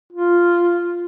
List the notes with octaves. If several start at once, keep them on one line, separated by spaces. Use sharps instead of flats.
F4